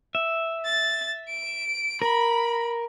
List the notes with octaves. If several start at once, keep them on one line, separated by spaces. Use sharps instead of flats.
E5
A6
D7
A#4 B5